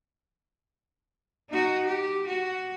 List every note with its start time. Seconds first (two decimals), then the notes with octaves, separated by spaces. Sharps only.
1.50 D#4 F#4
1.86 G4
2.26 F#4